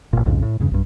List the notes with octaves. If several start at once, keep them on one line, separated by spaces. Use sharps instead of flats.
A1 E2 A#2
B1 F2 G#2 C#3
A2
E2 G2 C#3
B1 G2